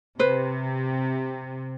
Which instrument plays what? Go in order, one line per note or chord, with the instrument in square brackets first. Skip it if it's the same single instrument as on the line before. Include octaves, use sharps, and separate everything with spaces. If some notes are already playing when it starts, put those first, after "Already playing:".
[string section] C3 [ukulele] B4 C5